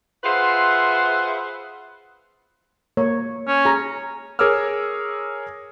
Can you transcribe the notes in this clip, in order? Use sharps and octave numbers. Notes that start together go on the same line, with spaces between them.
F4 G#4 B4 C5 E5 F#5
A#3 C#5
C#4
G#4 A#5
G#4 A#4 C#5 D6 E6 F6